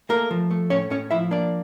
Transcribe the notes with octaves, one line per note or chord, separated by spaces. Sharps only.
A3 A#3 A#4
F3
A3
A2 C#4 C#5
A2 C#4 C#5
F3 E4 E5
A#3 D4 D5